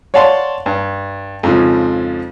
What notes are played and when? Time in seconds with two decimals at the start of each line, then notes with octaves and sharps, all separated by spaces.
0.14 C#5 D5 F5 F#5 A5 C6
0.66 G2
1.43 F2 G#2 C#3 F3